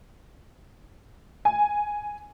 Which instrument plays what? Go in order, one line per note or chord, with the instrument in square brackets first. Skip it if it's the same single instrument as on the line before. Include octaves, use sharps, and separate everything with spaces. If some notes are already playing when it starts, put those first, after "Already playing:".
[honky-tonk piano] G#5